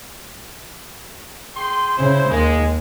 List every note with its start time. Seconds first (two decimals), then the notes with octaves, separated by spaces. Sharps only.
1.55 G#4 G5 C6
1.96 C#3 E4 C5
2.29 D#2 G#3 A#3